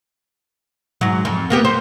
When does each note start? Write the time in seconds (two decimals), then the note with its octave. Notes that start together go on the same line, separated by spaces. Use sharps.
1.01 G#2 F#3
1.25 F2
1.50 A#3 B3 G4
1.65 C5